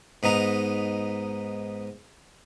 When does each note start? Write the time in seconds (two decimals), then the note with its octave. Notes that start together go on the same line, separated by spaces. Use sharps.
0.23 G#2 B3 D#4 A#5